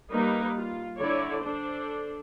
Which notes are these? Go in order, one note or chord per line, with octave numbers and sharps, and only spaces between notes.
G3 A#3 D#4 A#4 B4
F4
D3 E4 A4 C#5 D5
D4 A4 C5